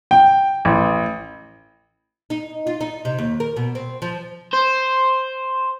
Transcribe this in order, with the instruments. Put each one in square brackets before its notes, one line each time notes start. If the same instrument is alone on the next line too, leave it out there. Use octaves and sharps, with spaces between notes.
[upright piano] G5
A1
[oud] D#4
F4
D#4
C3
D#2
A#4
B2
C4
F3
[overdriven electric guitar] C5